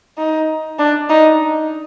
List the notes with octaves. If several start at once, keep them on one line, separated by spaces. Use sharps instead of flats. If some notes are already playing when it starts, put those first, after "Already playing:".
D#4
D4
D#4